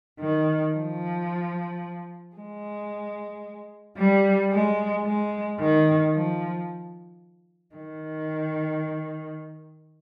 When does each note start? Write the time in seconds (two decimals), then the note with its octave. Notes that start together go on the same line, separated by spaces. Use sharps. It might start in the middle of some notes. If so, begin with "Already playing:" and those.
0.20 D#3
0.75 F3
2.36 G#3
3.97 G3
4.52 G#3
5.05 G#3
5.59 D#3
6.13 F3
7.75 D#3